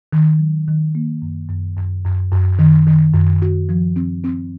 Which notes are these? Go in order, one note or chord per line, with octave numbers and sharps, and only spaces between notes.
D#3
F#3
D#3
A#3
F#2
F#2
F#2
F#2
F#2
D#3
D#3
F#2
F#4
F3
C4
C4